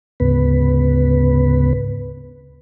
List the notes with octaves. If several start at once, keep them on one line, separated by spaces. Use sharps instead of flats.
D2 G#2 C#3 B3 B4